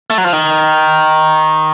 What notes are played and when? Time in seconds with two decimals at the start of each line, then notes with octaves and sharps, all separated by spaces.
0.10 A3
0.18 F#3
0.24 F3
0.33 D#3